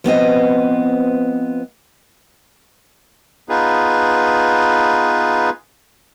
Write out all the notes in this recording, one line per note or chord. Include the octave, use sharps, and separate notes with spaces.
F3 B3 C4 D#5
B3 D#4 F4 G#4 B4